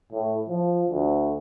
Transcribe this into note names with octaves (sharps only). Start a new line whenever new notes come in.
A2
F3
D2